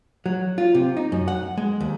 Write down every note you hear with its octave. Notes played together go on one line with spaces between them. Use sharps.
F#3
F4
C3
D#4
F#2
F#5
G#3
D#2